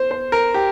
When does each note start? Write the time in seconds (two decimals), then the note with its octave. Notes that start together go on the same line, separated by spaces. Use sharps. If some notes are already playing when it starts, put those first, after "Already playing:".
Already playing: C5
0.11 C5
0.32 A#4
0.54 G4